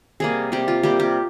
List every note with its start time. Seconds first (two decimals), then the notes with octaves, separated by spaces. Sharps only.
0.20 C3 G3 A#3 G#4
0.52 C3 G3 A#3 G4
0.68 F4
0.83 C3 G3 A#3 G4
1.00 G4